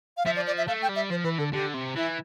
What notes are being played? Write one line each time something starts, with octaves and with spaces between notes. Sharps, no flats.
F5
F3 E5
D5
D5
E5
A3 F5
G5
G3
E5
F3 C5
E3 B4
D3 A4
D3 G4
C3
E3 E4